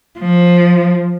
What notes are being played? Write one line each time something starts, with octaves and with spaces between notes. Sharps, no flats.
F3